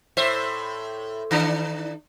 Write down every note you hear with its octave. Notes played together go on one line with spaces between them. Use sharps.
A2 C5 E5
D#3 D4